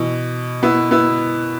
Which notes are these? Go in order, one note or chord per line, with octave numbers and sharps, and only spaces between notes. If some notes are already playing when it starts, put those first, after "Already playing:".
Already playing: B2 E3
B3 E4
B3 E4